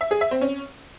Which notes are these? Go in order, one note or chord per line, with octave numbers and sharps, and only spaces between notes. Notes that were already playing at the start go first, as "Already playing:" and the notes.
E5
G#4
E5
C4
C#4